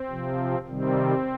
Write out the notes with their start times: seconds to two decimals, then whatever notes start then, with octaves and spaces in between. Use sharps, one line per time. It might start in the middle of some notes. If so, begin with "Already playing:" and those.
Already playing: C4
0.09 C3 F3
0.67 C3 D#3 G3 C4